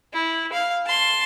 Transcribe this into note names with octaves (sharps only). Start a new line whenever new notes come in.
E4
F5
A5 C6